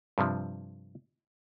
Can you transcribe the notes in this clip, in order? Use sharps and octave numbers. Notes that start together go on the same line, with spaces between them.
G2 C3 F3